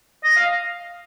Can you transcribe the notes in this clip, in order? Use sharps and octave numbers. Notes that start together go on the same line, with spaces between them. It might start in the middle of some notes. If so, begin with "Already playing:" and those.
D#5
F5